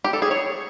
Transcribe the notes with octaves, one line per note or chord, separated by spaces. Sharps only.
G4
A4
G#4
C#5